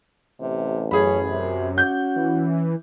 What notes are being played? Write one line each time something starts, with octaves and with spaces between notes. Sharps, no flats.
A1 C3
F#2 C#4 G#4 B5
C3
C#4 F#4 G6
E3